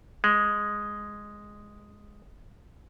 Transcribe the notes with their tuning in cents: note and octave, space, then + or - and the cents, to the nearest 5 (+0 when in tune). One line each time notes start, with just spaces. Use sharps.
G#3 -5